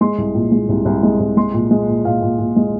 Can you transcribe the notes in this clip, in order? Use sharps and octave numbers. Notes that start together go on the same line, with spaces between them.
G#3 C6
C2
A#2
G#3
C2
C2
G#3
C2
G#3 C6
A#2
G#3
A#2
A#2 F5
A#2
A#2
G#3